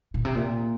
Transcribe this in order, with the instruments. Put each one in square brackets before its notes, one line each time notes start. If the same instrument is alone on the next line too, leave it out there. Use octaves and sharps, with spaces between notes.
[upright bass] A#2
C3
A#2